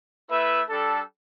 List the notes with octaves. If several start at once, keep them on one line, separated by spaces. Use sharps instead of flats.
A3 E4 B4 E5
G3 D4 A4